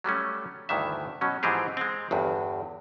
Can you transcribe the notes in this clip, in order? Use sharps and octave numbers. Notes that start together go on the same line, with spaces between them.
F#3 G3 A3 C#4
D2 G2 D#3 E3 E5
B2 F#3 C#4
G#2 E3 F3 C4 G4 G#4
G#3 C4
G1 E2 G2